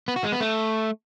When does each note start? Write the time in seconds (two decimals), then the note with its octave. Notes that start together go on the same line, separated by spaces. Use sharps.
0.08 B3
0.16 F#4
0.24 G#3
0.32 B3
0.40 A3